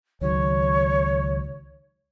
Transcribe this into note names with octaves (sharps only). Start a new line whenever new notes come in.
C#2 D#3 F#3 C#5